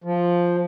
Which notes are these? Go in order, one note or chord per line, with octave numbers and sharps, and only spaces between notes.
F3